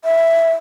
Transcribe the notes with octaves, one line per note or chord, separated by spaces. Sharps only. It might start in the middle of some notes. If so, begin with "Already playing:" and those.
E5